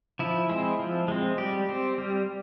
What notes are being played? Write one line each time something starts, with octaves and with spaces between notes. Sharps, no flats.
F3 E4
G#3 C4
F3
G#3 C4
G3 G4
C4
G3